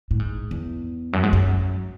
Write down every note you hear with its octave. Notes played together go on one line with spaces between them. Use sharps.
A2
G#2
E2
F#2
G#2
F#2